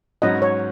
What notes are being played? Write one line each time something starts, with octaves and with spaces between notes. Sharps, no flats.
G#2 F#3 C#4 F#4 B4 D#5
C#5